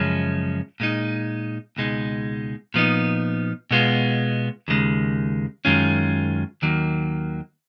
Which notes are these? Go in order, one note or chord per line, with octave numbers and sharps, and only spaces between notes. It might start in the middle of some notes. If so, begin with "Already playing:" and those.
Already playing: F#2 C#3 F3 G#3 C#4
A#2 G#3 D#4
C#2 B2 G#3 D#4
A#2 F3 B3 D#4
B2 G#3 B3 F4
D#2 C#3 G#3
F#2 D#3 G#3 C#4 F4
D#2 D#3 F#3 A#3